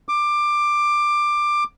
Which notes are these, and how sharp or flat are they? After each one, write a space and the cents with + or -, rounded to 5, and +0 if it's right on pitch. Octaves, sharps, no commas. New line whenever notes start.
D6 +15